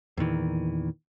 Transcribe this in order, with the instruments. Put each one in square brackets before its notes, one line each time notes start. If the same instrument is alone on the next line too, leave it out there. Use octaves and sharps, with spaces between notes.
[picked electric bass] E2 A#2 D#3 E3